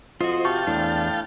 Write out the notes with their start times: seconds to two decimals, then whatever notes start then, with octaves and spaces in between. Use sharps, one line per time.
0.21 F2 F4 F#4 C5 D#5
0.45 C3 F5 G5 A5 C#6
0.67 E2 A2 D4